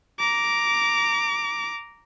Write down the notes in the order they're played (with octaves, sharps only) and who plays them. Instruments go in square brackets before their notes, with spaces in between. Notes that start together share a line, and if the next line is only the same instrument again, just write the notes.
[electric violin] A#5 D6